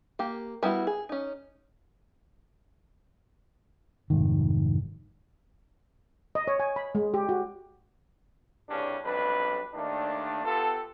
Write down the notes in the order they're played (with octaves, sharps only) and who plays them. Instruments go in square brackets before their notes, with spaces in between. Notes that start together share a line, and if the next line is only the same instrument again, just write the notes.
[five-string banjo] A#3 G4
G3 B3 E4 F#4
G#4
C#4 D#4
[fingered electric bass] F1 G#2 D#3
[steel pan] D#5
C#5
G#5
B5
G#3
G4
F#4
[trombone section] C2 G2 C#3 G3 C#4 D4
B1 F2 G3 D4 B4
D#2 D#3 A3 D4
B3 F4 G4 A4